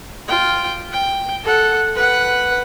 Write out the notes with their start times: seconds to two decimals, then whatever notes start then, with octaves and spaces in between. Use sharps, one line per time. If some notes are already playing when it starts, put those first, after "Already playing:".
0.28 F4 G5
0.92 G5
1.44 A4 F#5
1.95 B4 F#5